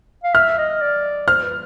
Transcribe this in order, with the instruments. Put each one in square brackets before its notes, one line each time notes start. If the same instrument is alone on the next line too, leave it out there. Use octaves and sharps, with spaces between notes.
[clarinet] F5
[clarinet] E5 [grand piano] F6
[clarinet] D#5
D5
[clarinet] C5 [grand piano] F6
[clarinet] B4